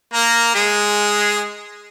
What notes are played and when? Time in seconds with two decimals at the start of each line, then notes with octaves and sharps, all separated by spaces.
0.13 A#3 A#4
0.55 G#3 G#4